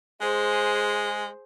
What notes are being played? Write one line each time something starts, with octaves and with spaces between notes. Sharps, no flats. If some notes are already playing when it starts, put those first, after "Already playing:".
G#3 G#4 C5